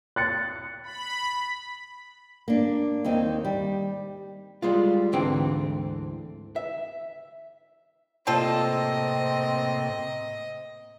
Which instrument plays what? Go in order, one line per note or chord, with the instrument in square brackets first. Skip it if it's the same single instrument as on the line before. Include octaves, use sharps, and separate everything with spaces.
[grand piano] F#6 A6 C#7
[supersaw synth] B5
[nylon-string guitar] A#3 D4
D#2 D#3 C4 D#4
G3
[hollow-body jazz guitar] G3 G#3 F4
D2 G#2 D3 E3 C4 G5
E5
[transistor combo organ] A2 C3 A#3 [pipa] G3 F4 A4 [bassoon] C4 [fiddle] D#5